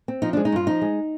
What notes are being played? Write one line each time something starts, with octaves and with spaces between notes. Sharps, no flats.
C4
F3 D#4
G#3 D4
D#4
G2 F4
F3 D#4
G#3